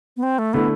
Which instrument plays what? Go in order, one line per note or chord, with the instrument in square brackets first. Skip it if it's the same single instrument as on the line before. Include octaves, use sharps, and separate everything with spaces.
[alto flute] B3
C4
A3
[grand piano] D3 A3 E4 [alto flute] B3